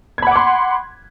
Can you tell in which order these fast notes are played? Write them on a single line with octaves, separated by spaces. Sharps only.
G#6 B5 F#5 D6 C6